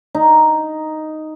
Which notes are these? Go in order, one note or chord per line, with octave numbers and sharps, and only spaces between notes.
D#4